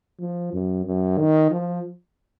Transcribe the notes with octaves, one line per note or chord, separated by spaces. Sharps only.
F3
F#2
F#2
D#3
F3